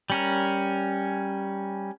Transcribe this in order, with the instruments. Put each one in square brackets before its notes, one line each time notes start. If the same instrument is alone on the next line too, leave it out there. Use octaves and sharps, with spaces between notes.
[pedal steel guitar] G3 C#4 A#4